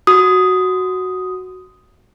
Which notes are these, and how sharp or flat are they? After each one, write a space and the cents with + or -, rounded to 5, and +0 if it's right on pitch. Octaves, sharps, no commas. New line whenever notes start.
F#4 +0 D#6 +0